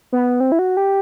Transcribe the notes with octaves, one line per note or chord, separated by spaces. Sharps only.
B3
C4
E4
F#4
G4